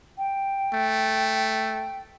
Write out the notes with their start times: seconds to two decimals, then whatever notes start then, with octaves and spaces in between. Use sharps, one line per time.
0.18 G5
0.74 A3